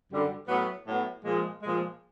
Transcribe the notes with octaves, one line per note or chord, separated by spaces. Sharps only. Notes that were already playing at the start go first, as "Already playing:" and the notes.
F#2 D3 G3
A2 F#3 B3
A2 F#3 B3
A#2 F3 G#3
A#2 F3 G#3